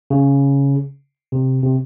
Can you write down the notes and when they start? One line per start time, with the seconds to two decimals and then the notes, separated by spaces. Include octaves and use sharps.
0.10 C#3
1.32 C3
1.63 C3